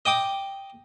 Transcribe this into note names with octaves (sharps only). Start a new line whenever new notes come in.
D#5 G5 D6 D#6